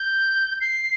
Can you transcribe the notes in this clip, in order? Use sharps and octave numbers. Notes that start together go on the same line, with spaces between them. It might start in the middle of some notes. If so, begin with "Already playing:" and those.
Already playing: G6
C7